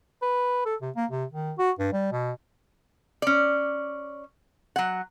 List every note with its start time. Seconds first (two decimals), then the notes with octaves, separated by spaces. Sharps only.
0.22 B4
0.65 A4
0.81 C3
0.96 A#3
1.11 C3
1.32 D#3
1.58 F#4
1.79 G2
1.92 G3
2.12 B2
3.22 C#4 D5
4.76 F#3 F#5